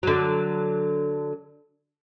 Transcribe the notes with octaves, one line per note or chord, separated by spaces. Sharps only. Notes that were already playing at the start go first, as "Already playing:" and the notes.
D3 F#3